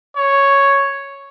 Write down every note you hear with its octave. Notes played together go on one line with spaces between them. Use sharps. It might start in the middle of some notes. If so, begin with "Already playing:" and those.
C#5